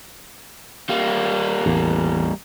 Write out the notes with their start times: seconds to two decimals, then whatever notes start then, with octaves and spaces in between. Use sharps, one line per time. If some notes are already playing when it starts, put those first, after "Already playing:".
0.90 G3 A#3
1.66 A1 E2